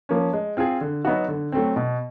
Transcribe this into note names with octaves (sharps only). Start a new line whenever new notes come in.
F3 A#3 C#4
G#3
C4 F4 G#4
D3
F#3 B3 D#4 F#4
D3
F#3 A3 C4
B2